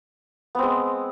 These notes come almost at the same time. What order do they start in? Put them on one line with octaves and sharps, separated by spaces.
B3 C4 G#3